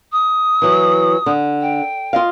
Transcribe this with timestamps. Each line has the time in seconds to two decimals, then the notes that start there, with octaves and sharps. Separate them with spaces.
0.12 D#6
0.62 E3 F#3
1.26 D3
1.61 G5
2.13 F4 D#5 F5